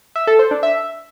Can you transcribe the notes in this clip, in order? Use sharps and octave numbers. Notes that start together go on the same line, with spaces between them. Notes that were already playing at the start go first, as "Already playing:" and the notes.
E5
A4
C5
D4
E5